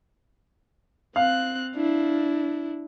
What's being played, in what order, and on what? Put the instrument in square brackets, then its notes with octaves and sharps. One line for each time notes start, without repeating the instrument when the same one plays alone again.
[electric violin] C4 F#6 [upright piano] F5
[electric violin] D4 E4